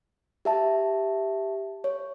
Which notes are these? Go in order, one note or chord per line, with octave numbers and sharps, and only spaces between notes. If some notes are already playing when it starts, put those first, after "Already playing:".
G4 E5 A5
C#5